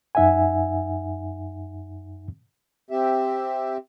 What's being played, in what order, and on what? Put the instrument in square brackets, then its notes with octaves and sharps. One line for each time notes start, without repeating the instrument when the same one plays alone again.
[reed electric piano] F#2 D#4 E5 F#5 G#5
[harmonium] C4 G4 E5